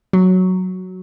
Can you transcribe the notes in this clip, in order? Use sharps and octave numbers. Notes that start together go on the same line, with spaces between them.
F#3